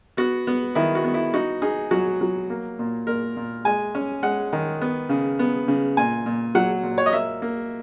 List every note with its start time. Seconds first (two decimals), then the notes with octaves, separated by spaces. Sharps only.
0.17 B3 F#4
0.47 B3
0.75 D#3 E4
0.95 F#4
1.04 B3
1.14 E4
1.34 D#4 F#4
1.62 D#4 G#4
1.91 F#3 F#4
2.21 F#3
2.50 A#3
2.79 A#2
3.07 A#2 A#4
3.37 A#2
3.65 G#3 G#5
3.95 C#4
4.23 G#3 F#5
4.53 D#3
4.81 B3
5.09 C#3
5.39 B3
5.68 C#3
5.97 A#2 G#5
6.26 A#2
6.55 F#3 F#5
6.83 A#2
6.98 C#5
7.06 D#5
7.13 A#3 E5
7.42 A#3